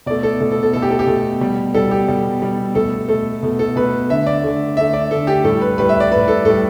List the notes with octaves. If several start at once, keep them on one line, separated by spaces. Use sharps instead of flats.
B2 A3 D5
A4
B2 A3
A4
A4
B2 A3 A4
G4
A4
G4
B2 A3
B2 G3
B2 G3 A4
G4
B2 G3
B2 G3
B2 A3 A4
B2 A3 A4
B2 A3
A4
B2 A3 B4
D3 A3 E5
D5
D3 A3
D3 A3 E5
D5
D3 A3 A4
G4
A2 G3 A4
B4
A2 G3 B4
E5
D5
A2 G3 B4
A4
A2 G3 A4